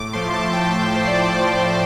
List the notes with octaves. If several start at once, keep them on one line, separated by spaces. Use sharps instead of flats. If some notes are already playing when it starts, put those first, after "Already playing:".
Already playing: A2 D6
F3 A3 C6
A5
A2 G5
A5
G5
F3 A3 C5
D5
A2
D5